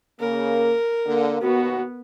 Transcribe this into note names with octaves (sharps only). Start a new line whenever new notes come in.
C#3 A#3 A#4
D3 A#3
D#2 B2 B3 F#4